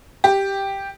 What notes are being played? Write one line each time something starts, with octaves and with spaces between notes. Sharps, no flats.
G4